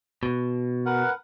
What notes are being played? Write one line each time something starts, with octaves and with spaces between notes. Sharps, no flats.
B2
A#4 B4 F#5